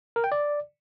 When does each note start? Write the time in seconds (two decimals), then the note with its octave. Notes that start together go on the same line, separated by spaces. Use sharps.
0.16 A#4
0.24 G5
0.32 D5